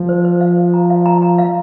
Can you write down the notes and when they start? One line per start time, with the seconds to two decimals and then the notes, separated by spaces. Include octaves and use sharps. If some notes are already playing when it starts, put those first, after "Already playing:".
Already playing: F3
0.09 C5
0.25 C5
0.41 F5
0.58 C5
0.74 A#5
0.90 F5
1.06 A#5
1.22 A#5
1.38 F5